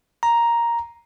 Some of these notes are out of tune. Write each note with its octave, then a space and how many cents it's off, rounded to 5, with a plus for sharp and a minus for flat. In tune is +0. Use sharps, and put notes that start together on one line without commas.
A#5 +5